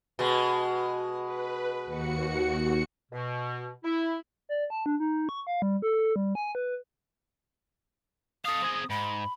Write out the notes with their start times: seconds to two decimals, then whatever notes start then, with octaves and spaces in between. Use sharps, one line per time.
0.19 B2 G#3
1.23 B4
1.86 D#2 F#4 C#7
3.12 B2
3.84 E4
4.49 D5
4.70 A5
4.86 D4
5.00 D#4
5.29 C#6
5.47 F5
5.62 G3
5.82 A4
6.16 G3
6.35 G#5
6.55 B4
8.45 A4 F5 D#6
8.62 C4 G#4
8.90 G#2 B5